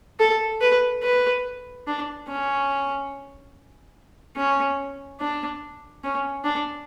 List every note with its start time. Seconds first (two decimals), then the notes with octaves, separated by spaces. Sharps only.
0.19 A4
0.61 B4
1.03 B4
1.87 D4
2.28 C#4
4.37 C#4
5.20 D4
6.04 C#4
6.44 D4